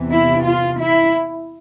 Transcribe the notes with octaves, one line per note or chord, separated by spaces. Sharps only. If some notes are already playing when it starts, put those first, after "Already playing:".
Already playing: E2 C3 E3
E4
F4
E4